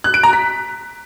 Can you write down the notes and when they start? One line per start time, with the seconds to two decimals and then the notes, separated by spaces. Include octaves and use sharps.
0.04 F#6
0.14 D7
0.23 A#5
0.33 B6